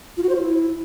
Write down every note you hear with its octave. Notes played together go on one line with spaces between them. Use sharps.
F4
F#4
C5
F4
E4